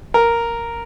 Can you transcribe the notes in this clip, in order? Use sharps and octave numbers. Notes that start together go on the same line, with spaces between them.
A#4